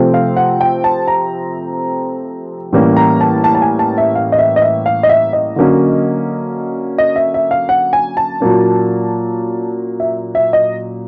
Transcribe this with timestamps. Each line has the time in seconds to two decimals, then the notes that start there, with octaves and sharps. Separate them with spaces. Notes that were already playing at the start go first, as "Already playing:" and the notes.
Already playing: C3 F3 A3 C4
0.14 F5
0.37 F#5
0.61 G5
0.84 A5
1.08 A#5
2.73 A2 E3 G3 A#3 C#4
2.97 A#5
3.21 A5
3.44 A5
3.55 A5
3.62 G#5
3.79 A5
3.98 E5
4.15 F5
4.32 D#5
4.39 E5
4.56 D#5
4.62 E5
4.86 F5
5.03 D#5
5.09 E5
5.33 D#5
5.56 D3 F#3 A#3 C#4
6.98 D#5
7.16 E5
7.34 E5
7.51 F5
7.69 F#5
7.93 G#5
8.17 A5
8.40 A#2 F#3 A#3 C#4
10.00 E5
10.35 E5
10.53 D#5